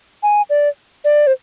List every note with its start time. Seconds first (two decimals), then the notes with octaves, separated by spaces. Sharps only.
0.23 G#5
0.50 D5
1.04 D5
1.27 C5